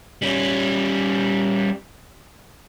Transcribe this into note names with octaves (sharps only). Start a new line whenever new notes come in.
G3 C#4